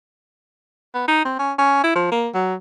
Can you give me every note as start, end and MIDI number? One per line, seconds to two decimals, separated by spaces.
0.94 1.06 59
1.08 1.24 63
1.25 1.38 60
1.39 1.53 61
1.58 1.83 61
1.83 1.95 64
1.95 2.10 53
2.11 2.28 58
2.34 2.54 54